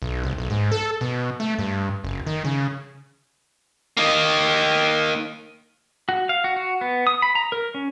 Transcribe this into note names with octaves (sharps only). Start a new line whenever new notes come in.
B1
C2
B1
G#2
A4
B2
A3
G2
F#1
D#3
C#3
A#3 D#4
F#4
F5
F#4
F#4
B3
D#6
B5
A#5
A#4
C#4